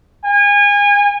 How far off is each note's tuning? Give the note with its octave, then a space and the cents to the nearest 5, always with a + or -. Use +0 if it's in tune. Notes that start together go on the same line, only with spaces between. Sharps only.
G#5 -30